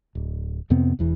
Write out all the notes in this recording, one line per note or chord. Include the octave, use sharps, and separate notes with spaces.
D1
F2 C3 B3 C4
E1 E2 E3